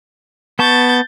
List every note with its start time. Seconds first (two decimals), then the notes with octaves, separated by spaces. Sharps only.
0.59 B3 A5 C#6 G6 A6